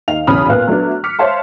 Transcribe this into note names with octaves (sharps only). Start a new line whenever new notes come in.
D#2 D#4 F5 F7
B1 E2 C#3 B5 D#6 F6
A#2 B3 F5 F#6
F#3 A3 B3 D4
D6 F6 B6 C#7
C5 C#5 E5 F5 A5 C6